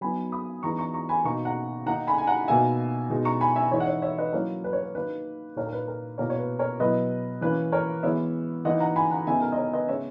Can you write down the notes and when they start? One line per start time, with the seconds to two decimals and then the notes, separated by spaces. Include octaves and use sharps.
0.01 F#3 B3 D#4 G#5 B5
0.32 B5 D#6
0.63 E3 G#3 B3 D#4 A#5 C#6
0.78 A#5 C#6
0.94 A#5 C#6
1.09 G#5 B5
1.24 B2 A#3 D#4 A#5 C#6
1.45 F#5 A#5
1.86 D#3 A#3 D#4 F#5 A#5
2.07 G#5 B5
2.18 G#5
2.27 F#5 A#5
2.48 B2 A#3 D#4 E5 G#5
3.10 B2 G#3 D#4
3.25 A#5 C#6
3.41 G#5 B5
3.56 E5 G#5
3.72 E3 G#3 D#4 C#5 E5
3.80 F#5
3.87 C#5 E5
4.02 C#5 E5
4.18 B4 D#5
4.33 F#3 A#3 C#4 E4 A#4 C#5
4.64 B4
4.73 C#5
4.82 B4
4.95 D#3 A#3 D#4 B4
5.56 A#2 A#3 D#4 A#4 C#5
5.66 A#4
5.73 B4
5.88 A#4
6.18 B2 A#3 E4 A#4 C#5
6.30 C#5
6.38 B4
6.59 A#4 C#5
6.80 B2 F#3 B3 E4 B4 D#5
7.41 E3 A#3 C#4 B4
7.72 A#4 C#5
8.03 E3 G#3 B3 C#5 E5
8.65 E3 A#3 D#4 D#5 F#5
8.80 F#5 A#5
8.96 G#5 B5
9.11 F#5 A#5
9.27 C#3 G#3 B3 D#4 E5 G#5
9.42 A#4
9.52 D#5
9.57 A#4 C#5
9.73 B4 D#5
9.88 C#3 G#3 B3 C#5 E5